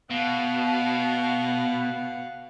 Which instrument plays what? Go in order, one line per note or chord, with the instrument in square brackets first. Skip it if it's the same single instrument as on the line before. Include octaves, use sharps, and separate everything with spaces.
[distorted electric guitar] B2 [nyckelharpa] F5 F#5